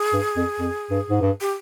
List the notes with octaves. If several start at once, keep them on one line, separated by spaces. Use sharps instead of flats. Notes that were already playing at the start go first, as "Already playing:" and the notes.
Already playing: G#4
G2
F2
F2
G2
G#2
G2
G4